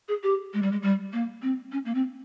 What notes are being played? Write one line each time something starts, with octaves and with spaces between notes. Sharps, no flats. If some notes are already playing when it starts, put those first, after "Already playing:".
G#4
G4
G#3
G3
G#3
G3
A#3
C4
C#4
A#3
C4